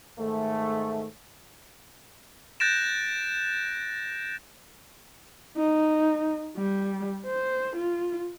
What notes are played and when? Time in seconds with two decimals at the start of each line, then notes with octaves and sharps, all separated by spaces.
0.19 G#2 D#3 A3
2.60 F#6 G6 A6 A#6 D7 E7
5.57 D#4
6.57 G3
7.26 C5
7.76 F4